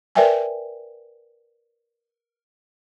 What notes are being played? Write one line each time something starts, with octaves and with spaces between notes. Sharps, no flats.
A#4 B4 D5 E5 G5 G#5